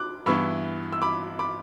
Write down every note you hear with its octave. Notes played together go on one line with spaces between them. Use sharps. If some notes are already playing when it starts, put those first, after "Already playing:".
Already playing: D6 F#6
G2 E3 B3 E4 C#6 E6
E6
B5 D6
B5 D6